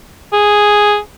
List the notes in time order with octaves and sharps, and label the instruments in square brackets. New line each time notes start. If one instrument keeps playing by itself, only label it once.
[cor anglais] G#4